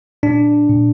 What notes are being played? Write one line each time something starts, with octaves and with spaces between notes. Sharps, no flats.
A#2 D4
A#2